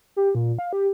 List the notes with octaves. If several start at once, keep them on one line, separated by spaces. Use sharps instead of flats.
G4
A#2
F5
G4